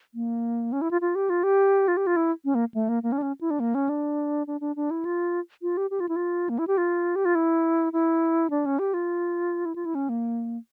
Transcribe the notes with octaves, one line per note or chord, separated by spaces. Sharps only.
A#3
C#4
E4
F4
F4
G4
F4
G4
F4
G4
F4
E4
C#4
A#3
A3
A#3
A#3
C#4
D4
C#4
E4
D4
A#3
C#4
D4
D4
D4
D4
E4
F4
F4
G4
G4
F4
E4
F4
A#3
E4
G4
F4
G4
F4
E4
E4
D4
C#4
G4
F4
E4
F4
E4
C#4
A#3